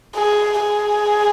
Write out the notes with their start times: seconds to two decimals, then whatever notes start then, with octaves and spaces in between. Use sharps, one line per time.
0.16 G#4
0.61 G#4